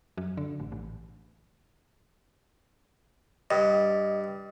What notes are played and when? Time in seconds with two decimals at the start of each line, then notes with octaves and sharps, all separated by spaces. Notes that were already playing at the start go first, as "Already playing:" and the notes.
0.18 F#2
0.37 D3
0.60 A1
0.72 A1
3.51 G2 D#5